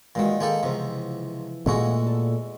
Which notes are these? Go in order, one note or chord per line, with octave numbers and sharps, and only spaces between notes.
A#2 D#3 E3 G#3 F#4
D#3 G#3 A#3 A4 G5
C#2 C3 E3 F3 B3
E2 A#2 G#3 A3 F#4
A4